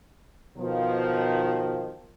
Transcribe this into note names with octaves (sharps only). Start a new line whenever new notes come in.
B2 D#3 F3